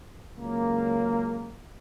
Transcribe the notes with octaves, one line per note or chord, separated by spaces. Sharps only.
C#2 C#3 F#3 A#3